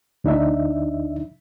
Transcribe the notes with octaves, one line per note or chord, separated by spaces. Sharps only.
D2 D4 D#4 E5